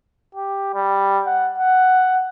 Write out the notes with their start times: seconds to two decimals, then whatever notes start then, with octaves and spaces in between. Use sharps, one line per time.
0.35 G4
0.74 G3
1.27 F#5
1.58 F#5